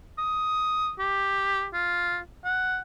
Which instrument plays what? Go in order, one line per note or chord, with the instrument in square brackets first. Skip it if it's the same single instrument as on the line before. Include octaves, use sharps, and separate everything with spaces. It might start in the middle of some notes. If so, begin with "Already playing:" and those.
[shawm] D#6
G4
F4
F#5